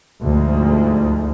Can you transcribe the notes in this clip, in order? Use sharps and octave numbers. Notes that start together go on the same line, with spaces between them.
D2 G#2 F3